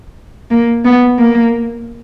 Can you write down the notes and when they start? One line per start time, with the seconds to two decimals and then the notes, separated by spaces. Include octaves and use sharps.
0.51 A#3
0.85 B3
1.19 A#3